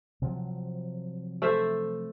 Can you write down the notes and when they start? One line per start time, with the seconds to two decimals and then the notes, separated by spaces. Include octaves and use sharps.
0.22 C3 F3 F#3
1.42 A3 C5 E5